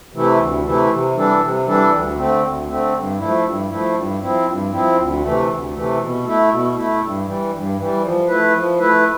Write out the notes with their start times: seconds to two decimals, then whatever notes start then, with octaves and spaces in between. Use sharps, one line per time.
0.13 C3 E3 A3 E4
0.38 D2
0.63 C3 E3 A3 E4
0.89 C3
1.15 E3 G3 D4 A4
1.40 C3
1.66 E3 G3 D4 A4
1.91 D2
2.16 D3 A3 C4
2.42 D2
2.68 D3 A3 C4
2.93 G2
3.18 F3 A3 E4
3.44 G2
3.70 F3 A3 E4
3.95 G2
4.20 F3 C4 E4
4.46 G2
4.71 F3 C4 E4
4.97 D2
5.22 C3 E3 A3
5.48 D2
5.73 C3 E3 A3
5.99 B2
6.24 A3 E4
6.50 B2
6.75 A3 E4
7.01 G2
7.26 E3 G3
7.51 G2
7.77 E3 G3
8.02 F3
8.28 A3 E4 B4
8.53 F3
8.79 A3 E4 B4